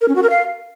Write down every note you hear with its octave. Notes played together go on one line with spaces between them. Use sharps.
A#4
C#4
F#4
A#4
F5